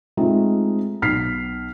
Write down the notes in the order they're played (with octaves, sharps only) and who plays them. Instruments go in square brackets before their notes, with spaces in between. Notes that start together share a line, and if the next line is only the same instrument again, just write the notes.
[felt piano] G#3 A3 C4 D#4 F4
B1 F6 B6 C7